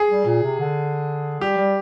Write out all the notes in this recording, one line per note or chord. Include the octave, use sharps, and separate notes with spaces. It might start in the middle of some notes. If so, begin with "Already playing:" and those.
Already playing: G#4
G3
A#2
C3
D3
G3 G4
G3